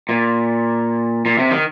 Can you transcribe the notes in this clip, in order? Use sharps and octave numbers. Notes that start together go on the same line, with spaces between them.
A#2
A#2
C3
D#3